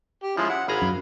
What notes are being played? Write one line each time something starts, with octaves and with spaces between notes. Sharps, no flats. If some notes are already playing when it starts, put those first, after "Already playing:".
G4
F3 G#3 C#4 E4 F4
E4 F#5
G#1 G#4 F5 A#5 B5
F#2